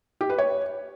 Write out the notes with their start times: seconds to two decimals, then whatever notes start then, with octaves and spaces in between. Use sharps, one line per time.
0.21 G4
0.30 B4
0.38 C#5